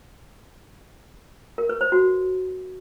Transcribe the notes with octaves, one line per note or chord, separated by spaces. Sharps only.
A#4
B4
C5
F#4